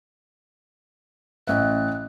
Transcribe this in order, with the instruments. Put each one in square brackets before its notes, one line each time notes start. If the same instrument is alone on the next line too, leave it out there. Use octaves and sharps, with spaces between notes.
[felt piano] A1 E5 [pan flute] F#6